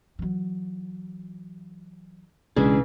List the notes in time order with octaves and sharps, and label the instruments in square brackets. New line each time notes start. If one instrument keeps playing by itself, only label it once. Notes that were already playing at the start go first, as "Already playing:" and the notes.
[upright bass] E3 F#3
[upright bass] B1 [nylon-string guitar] C#3 E3 [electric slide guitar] G#3 D4 G#4